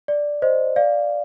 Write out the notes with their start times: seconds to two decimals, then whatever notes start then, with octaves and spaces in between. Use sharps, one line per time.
0.08 D5
0.42 C5 D#5
0.76 D5 F5